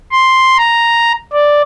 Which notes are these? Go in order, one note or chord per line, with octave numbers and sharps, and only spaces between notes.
C6
A#5
D5